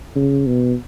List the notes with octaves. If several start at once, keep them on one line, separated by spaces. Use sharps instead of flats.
C#3
B2